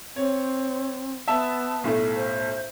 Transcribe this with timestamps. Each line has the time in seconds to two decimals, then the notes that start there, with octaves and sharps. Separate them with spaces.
0.16 C4 C#5
1.28 B3 E5 A5 E6
1.84 B1 A2 A3
2.16 C5